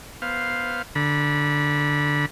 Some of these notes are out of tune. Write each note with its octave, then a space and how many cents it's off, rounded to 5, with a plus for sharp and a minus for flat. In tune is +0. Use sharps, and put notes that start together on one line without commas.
B3 -10 C5 +0 F5 +0
D3 +0 B5 -30